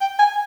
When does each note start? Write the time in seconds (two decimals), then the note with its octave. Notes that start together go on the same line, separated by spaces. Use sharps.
0.01 G5
0.19 G#5